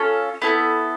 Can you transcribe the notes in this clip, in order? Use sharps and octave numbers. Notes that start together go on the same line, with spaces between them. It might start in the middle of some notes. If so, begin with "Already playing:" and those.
Already playing: C#4 F4 A4
B3 E4 A4